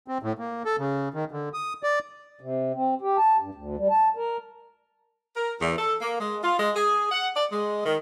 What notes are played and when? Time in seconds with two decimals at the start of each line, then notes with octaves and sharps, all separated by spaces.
0.08 C4
0.23 A2
0.39 A#3
0.65 A4
0.79 C#3
1.14 D#3
1.32 D3
1.54 D#6
1.83 D5
2.41 C3
2.75 C4
3.01 G4
3.18 A5
3.40 G2
3.55 D2
3.77 G3
3.91 A5
4.16 A#4
5.35 A#4
5.60 E2
5.77 A4
6.01 A#3
6.19 G#3
6.42 F4
6.59 G#3
6.74 G#4
7.11 F#5
7.36 D5
7.51 G#3
7.85 D#3